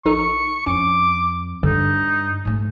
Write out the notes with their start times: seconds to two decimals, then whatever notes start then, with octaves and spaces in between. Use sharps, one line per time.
0.05 A#1 D#4 A4 C#6
0.66 F2 C#4 D6
1.63 G2 D3 D#4
2.45 G#2 A3